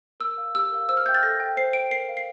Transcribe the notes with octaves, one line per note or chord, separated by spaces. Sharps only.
A#4 E6
F5
G4 E6
A#4 F5
C5 E6
F6
E5 G5 G6
A6
A4 A#6
E5 G5
C5 C7
G5 D7
A#4 C7
F5
C7